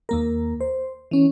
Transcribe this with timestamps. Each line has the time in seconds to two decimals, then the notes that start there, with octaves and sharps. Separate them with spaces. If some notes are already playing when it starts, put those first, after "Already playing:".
0.09 D#2 A#3 A#4
0.61 C5
1.11 E3 C#4